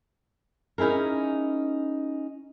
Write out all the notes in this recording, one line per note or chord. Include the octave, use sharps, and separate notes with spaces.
C#4 D#4 E4 G#4 A#4